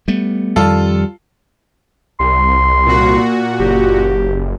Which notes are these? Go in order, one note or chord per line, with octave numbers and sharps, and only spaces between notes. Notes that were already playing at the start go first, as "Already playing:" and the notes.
G3 A3 B3
F2 D#3 G3 F4 A4
C2 C6
A#2 F#4
F#1 G4